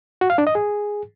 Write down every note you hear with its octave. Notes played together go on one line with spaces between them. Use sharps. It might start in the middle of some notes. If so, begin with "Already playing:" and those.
F#4
F5
D4
D#5
G#4